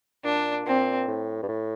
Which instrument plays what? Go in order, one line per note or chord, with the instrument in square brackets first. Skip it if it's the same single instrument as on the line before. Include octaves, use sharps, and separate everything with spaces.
[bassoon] A#2 [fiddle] D4
[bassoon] A#2 [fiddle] C4
[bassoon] A2
G2
A2